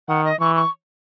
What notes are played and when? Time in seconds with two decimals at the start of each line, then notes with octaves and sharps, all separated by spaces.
0.08 D#3 F#5
0.24 D#5
0.40 E3 C#6
0.55 C#6